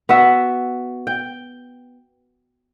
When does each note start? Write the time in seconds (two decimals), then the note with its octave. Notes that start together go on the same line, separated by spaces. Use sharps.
0.09 B3 F#4 E5
1.07 G5